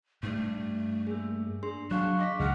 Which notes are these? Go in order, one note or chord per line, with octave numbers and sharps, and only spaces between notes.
G2 A3
A#3 G#4
D4 G#4 C6
F#3 D4 F5 C#6 F#6
D#5 D6 A#6 B6
C#2 G#4 F#5 F6 F#6